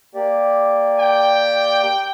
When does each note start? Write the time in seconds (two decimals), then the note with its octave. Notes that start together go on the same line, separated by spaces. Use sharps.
0.15 A#3 G4 D5
1.00 G5